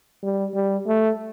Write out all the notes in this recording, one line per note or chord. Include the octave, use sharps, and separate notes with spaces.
G3
G3
A3